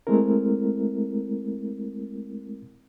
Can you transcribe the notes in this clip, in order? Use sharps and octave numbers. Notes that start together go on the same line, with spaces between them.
G#3 A3 C4 E4 A#4